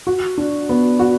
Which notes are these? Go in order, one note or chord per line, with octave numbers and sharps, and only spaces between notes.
F#4
D4
B3
F#4